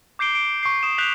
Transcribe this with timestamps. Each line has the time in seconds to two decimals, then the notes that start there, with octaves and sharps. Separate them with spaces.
0.19 D6 G6 C7 D7 G7
0.35 D7
0.63 C#6 C7
0.83 C#6 D#6 E7
0.98 F#6 G6 B6 F7 F#7